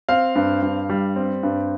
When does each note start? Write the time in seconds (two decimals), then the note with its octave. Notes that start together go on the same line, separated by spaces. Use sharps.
0.09 C4 F5
0.35 G2
0.62 G2
0.90 G3
1.16 C4
1.43 G2